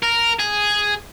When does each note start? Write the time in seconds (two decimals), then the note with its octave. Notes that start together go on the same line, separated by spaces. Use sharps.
0.03 A#4
0.39 G#4